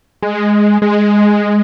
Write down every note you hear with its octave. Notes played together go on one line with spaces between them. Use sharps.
G#3
G#3